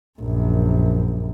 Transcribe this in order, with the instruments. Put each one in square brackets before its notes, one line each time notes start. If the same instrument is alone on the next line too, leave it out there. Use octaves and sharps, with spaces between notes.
[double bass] A#1 F#2